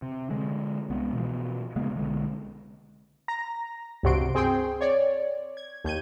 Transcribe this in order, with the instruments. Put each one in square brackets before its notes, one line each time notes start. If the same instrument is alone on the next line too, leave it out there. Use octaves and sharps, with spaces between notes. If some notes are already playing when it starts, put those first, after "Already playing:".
[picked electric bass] C3
D3 G#3
C2 G#3 B3
B2 E3 F3
C#3 G#3 A#3 B3
B1 D3 G#3
[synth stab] A#5 A#6
C#2 G2 C3 F#4 C6 D7
C4 G#4 G5 C6
C#5 D5
G#6
D#2 G6 G#6 D#7